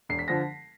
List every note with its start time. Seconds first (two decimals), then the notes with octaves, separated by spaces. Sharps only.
0.09 E1 C7
0.19 B6
0.28 D3 F3 A#6